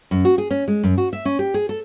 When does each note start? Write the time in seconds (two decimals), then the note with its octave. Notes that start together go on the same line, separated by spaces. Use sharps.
0.11 F#2
0.25 F#4
0.38 G#4
0.51 C#4
0.68 G#3
0.83 F#2
0.98 F#4
1.13 E5
1.25 C#4
1.39 G4
1.54 G#4
1.69 A4